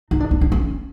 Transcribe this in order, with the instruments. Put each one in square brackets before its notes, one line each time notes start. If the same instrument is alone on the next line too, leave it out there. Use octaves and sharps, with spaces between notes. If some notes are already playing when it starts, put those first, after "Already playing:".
[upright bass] D#4
D4
D#4
D4
C#4